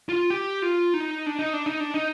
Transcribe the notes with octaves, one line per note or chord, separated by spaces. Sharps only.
F4
G4
F4
D#4
D4
D#4
D4
D#4
D4
D#4